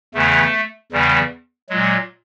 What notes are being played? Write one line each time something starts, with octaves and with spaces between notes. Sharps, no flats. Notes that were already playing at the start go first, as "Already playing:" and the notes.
E2 C#3 E3 A3
E2 C#3 E3 G3
A#2 F#3 G#3